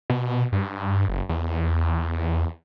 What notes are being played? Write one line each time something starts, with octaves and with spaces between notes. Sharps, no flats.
B2
G2
F#1
E2